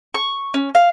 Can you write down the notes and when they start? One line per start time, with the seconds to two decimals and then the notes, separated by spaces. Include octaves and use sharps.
0.14 C#6
0.54 C#4
0.75 F5